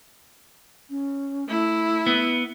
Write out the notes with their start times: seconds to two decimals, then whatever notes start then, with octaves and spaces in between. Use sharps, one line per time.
0.90 C#4
1.49 A3 E4
2.06 B3